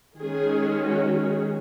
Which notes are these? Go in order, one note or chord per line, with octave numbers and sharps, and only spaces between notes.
D#3 G#3 C#4 G#4
F#4
G#4